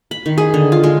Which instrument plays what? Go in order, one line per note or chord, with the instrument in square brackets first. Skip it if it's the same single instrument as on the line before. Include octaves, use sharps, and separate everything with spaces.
[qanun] B5
D#3
G#4
D3
F4
G#3